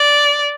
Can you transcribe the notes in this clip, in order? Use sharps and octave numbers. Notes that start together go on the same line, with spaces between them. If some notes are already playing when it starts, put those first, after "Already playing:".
Already playing: D5